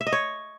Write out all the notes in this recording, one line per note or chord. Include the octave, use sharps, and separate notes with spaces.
E5
D#5
C#5